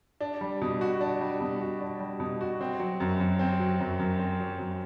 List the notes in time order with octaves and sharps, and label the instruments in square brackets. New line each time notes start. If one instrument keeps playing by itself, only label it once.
[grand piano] D4
G3
B2
F#4
D4
G3
B2
F#4
D4
G3
B2
F#4
C4
F#3
F#2
F#2
C4
F#3
F#2
F#2
C4
F#3
F#2